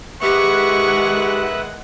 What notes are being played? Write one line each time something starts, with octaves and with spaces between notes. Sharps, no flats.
D#3 G#3 G4 B4 E5 F#5 C#6